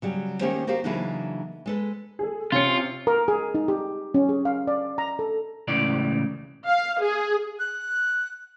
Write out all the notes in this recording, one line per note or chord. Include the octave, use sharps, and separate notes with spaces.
C#3 F#3 G3
D#3 A#3 C#4 G4 C5
F#4 G4 A#4 C5 F5
C#3 E3 F#3 A#3 D4 D#4
G#3 A4 B4
G#4 A4
C3 C#4 F4 C#7
A#4
G#4
D#4
G4
C#4
G#4
F5
D5
A#5
A4
C#2 A2 C#3 E3 D5
F5
G#4
F#6